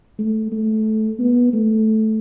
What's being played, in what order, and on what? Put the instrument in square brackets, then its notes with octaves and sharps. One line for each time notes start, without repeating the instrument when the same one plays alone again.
[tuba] A3
A3
B3
A3